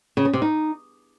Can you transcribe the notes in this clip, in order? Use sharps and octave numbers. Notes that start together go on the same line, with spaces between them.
C#3
C#4
C3
D#4